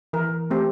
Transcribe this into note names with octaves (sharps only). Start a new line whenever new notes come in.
E3 A#4
A3 C4 G4